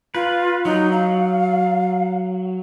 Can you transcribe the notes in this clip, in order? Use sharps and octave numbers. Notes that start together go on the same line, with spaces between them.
F4 B4
F#3 D#4
F5